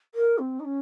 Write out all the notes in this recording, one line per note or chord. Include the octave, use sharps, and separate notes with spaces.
A#4
C4
D#4
C#4